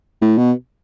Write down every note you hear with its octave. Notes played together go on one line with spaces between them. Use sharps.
A2
B2